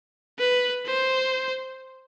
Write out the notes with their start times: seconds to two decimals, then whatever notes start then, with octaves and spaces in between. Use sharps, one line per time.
0.39 B4
0.86 C5